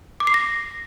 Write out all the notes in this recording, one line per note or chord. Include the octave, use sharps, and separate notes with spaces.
D6
C7
A#6